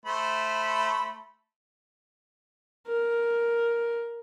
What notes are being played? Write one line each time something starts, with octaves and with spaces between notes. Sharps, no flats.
A3 C5 B5
A#4